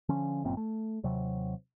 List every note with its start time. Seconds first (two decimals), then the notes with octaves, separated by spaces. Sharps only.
0.09 D3 F3 C#4
0.44 G1 F#2 A#2 C4
0.57 A3
1.04 D#2 C3 F#3